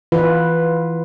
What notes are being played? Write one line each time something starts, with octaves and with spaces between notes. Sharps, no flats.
E3 F4 B4